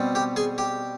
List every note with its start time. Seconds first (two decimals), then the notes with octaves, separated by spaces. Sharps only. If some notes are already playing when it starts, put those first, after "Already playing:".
Already playing: B2 G3 C4
0.15 G4 G5
0.36 G#4 G#5
0.58 G4 G5